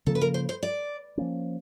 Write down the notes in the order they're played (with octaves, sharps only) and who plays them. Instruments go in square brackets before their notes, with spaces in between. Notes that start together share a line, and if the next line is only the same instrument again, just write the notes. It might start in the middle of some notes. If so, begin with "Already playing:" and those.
[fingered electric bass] C#3 F3 A#3 [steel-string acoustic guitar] A4
[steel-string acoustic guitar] B4
A#4
C5
C5
D5
[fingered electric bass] F3 A#3 C#4